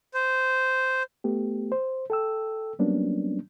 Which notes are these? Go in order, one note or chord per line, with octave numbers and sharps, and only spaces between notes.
C5
A3 B3 G4
C5
A4 G5 E6
F#3 G3 A#3 B3 C#4 D4